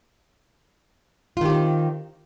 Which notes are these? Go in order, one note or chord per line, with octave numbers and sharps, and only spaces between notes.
D#3 C4 F4 G4